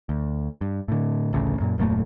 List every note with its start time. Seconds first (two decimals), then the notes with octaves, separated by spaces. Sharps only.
0.09 D2
0.61 G2
0.88 A2 D3
1.33 A1 D2 C#3
1.60 F#2 A#2
1.78 D#1 F#2 A#2 A3